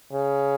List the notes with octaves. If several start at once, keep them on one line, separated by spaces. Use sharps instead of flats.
C#3